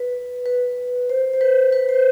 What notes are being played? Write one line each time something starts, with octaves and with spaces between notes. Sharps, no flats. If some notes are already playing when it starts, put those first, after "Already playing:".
Already playing: B4
B4
C5
C5
B4
B4
C5